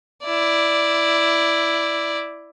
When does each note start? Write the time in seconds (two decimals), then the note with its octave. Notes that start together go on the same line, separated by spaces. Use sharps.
0.24 E4 D5